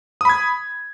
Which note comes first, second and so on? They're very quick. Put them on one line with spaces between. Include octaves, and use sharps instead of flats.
D#6 B5 G#6